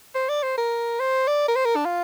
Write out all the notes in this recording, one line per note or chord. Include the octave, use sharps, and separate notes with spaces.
C5
D5
C5
A#4
C5
D5
A#4
C5
A#4
D4
F4